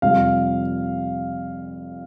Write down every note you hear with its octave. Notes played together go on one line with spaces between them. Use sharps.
F2 C3 G3 F5